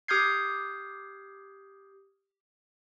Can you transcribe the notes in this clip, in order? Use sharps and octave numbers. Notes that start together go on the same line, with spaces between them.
G4 D#6 F6 G6 G#6 C7